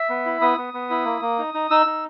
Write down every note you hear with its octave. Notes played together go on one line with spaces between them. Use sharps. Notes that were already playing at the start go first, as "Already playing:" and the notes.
Already playing: E5
B3
E4
B3 D#6
B3
B3
E4
A#3
A#3
D#4
D#4
D#4 E6
D#4